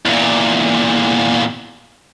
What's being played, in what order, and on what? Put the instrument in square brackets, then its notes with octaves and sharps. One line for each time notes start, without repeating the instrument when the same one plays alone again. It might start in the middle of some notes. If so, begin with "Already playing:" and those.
[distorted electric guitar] E2 A#2